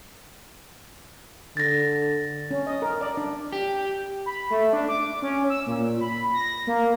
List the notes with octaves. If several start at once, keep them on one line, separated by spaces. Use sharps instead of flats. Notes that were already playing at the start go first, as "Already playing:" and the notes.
D3 A6 A#6
C#4
D#5
A#4
D5
D4
G4
B5
A3
D4
D6
C#4
E6
A#2
B5
A#6
A#3